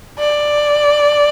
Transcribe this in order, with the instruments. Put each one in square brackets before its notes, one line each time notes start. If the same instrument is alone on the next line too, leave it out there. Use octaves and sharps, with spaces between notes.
[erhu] D5